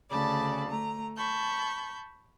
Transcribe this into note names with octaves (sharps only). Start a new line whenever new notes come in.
D2 C#3 D5 A5 B5
A3 A#5
A5 B5 C#6 G6